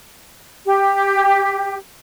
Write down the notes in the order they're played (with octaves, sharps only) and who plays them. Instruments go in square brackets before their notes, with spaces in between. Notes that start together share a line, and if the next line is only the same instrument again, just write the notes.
[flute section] G4